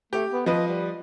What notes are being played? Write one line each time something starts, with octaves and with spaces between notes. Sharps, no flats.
A3 G4
B3
F3 B4 D#5
G3